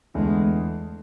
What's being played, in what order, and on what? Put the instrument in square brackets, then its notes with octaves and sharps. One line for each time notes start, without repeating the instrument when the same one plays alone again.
[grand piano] E2 D3 A3 E4 [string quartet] G#3